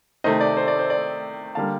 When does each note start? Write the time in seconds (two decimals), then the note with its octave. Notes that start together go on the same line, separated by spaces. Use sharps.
0.24 C3 D#3 A3 C5 D#5
0.40 D5
0.57 C5
0.68 D5
0.79 C5
0.90 D5
1.55 D3 G3 A#3 F5 A5